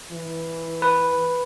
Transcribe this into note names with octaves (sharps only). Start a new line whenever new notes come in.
E3
B4